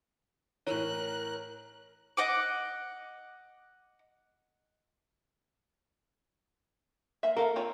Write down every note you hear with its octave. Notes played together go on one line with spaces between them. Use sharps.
A2 E3 A#4 C#5 F#6
D#5 F#5 D6
A#3 E5
A#3 A4 A#4 F5
C4 F4 C#5